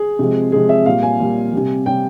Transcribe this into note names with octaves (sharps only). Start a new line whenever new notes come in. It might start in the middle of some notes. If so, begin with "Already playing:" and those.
Already playing: G#4
C3 F3 G#3
C3 F3 G#3 G#4
E5
A#2 G3 F5
G#5
A#2 G3
C3 G3
C3 G3 G5